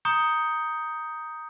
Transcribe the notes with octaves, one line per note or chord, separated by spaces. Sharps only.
A#5 C#6 D#6 G6 C#7 G7